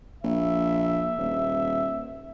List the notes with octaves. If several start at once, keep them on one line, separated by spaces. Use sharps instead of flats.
A#1 E5
D#1